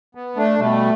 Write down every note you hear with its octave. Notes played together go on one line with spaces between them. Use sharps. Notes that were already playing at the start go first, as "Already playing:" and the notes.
B3
A3 D4
B2 G3 A3